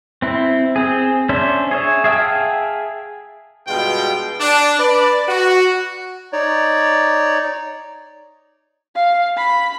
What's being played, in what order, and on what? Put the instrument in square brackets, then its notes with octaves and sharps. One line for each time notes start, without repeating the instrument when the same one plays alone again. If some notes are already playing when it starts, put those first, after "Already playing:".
[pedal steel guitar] C4 E4
C4 G#4
C#4 D4 C5 E5
G#4 C#5 E5
G#4 E5 F5 G5 A5
[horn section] G2 B2 G#3 F4 G5
D4
B4 D5
F#4
[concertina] D#4 C#5 D5
[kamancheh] F5
B5